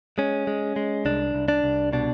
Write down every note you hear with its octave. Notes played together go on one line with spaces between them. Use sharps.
G#3 C#4
G#3
G#3
C2 D4
C2
D4
C2
B2 D4